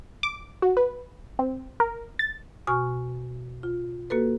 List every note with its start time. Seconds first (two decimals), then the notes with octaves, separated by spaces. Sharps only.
0.23 D6
0.62 F#4
0.77 B4
1.39 C4
1.80 A#4
2.19 A6
2.67 B2 F#4 G#5 C#6 F6
3.63 F4
4.10 A#3 F#4 A4 B4